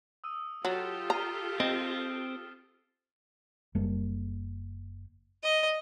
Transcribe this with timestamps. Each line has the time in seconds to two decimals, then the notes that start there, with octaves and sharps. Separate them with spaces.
0.24 D#6 E6 D#7
0.65 F#3 F4 G4 A4 A6 C#7 E7
1.10 A#5 F6 C7 D#7
1.60 C4 D#5
3.75 F#1 G3 A#3
5.43 D#5